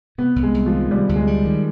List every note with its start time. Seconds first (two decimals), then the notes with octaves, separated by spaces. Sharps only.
0.18 C3 B3
0.36 C2
0.43 G#3
0.54 C2
0.66 F3
0.73 D#3
0.91 C3 G3
1.09 D2
1.16 G#3
1.27 G3
1.45 D#3